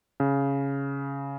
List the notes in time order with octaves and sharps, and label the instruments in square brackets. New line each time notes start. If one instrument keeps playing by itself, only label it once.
[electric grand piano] C#3